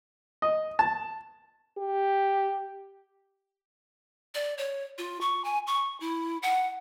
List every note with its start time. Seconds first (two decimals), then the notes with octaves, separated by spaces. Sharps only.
0.42 D#5
0.79 A5
1.78 G4
4.35 D5
4.58 C#5
4.98 F4
5.21 C#6
5.45 G#5
5.67 C#6
6.00 E4
6.43 F#5